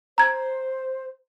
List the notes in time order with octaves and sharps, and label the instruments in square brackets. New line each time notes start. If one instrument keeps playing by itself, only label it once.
[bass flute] C5 [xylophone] A#5 G#6